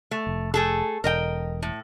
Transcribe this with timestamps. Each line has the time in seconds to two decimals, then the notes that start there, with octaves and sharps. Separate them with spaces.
0.11 A3
0.27 F1
0.54 A3 G#4 A4
1.04 E1 A#4 D#5 G5
1.63 A2